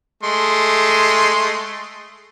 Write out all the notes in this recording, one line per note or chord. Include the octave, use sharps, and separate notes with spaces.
G#3 A3 C6